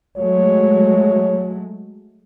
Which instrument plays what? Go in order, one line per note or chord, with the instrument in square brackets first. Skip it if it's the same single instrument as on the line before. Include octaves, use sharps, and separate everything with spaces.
[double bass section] F#3 G#3 A3 [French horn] C#5